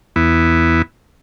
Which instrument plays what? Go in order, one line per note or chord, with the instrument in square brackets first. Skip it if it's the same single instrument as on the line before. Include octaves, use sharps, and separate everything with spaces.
[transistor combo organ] E2 B3 E4